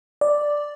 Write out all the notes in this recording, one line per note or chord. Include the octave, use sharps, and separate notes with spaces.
D5